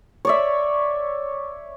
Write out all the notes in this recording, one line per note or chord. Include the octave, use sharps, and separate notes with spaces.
C#5 D5 E5